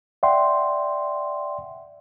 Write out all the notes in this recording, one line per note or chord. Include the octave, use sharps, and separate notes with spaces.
D5 E5 F#5 G5 C6